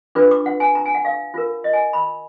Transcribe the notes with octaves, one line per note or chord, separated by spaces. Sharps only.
D4 F4 B4 D6
D6
F#5
G#5
A#5
G#5
F#5
F5
F4 A#4
D#5
G#5
B5